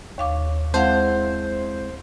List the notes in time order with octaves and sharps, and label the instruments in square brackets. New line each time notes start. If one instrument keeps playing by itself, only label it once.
[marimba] D#2 F5 D6 [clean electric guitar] C#5
[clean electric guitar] G#3 C4 E4 [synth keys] C5 [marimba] F5 F#5 A5